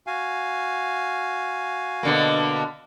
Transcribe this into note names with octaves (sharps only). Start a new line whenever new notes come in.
F#4 F5 G#5
B2 D3 A#3